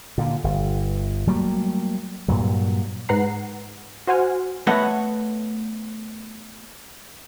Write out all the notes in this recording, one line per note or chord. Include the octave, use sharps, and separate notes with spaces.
A#2 D3
G1
F#3 G3 A3 A#3
G2 A#2 F#3
G#2 B4 F#5 A#5 C7
F#4 C5 F#5 G#5 F6
A3 B3 B4 C#5 D#5 F#5